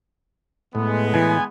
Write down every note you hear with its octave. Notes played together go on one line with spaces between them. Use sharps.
A2 G#3 B3
A2 E3 G#5